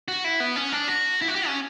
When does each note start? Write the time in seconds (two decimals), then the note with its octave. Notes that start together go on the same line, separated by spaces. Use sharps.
0.08 F#4
0.24 E4
0.40 B3
0.56 C#4
0.72 D4
0.88 F#4
1.22 E4
1.28 F#4
1.35 G4
1.47 C#4